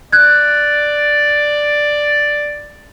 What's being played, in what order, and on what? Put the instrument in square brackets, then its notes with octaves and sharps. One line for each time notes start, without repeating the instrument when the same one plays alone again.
[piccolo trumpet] D5 [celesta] F#6 G#6